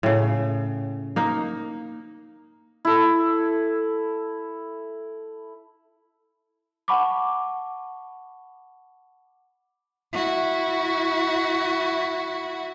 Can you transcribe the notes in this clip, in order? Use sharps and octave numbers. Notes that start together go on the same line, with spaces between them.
A2 C#3
A#3 D#4
E4 A4
F#5 A5 B5 C#6 D6
E4 F#4